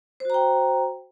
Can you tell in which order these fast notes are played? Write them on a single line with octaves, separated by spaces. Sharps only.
C5 F#4 A#5 G5